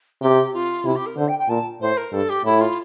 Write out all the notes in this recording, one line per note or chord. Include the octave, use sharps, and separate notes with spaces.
C3 G4
F4
C3 E4
G4
A#4
D3 C5
G5
G5
A#2 A5
A2 C5
A#4
G2 A4
G4
A2 E4
F4